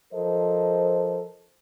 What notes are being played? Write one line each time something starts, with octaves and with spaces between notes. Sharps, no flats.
F3 A4 A#4 C5 D#5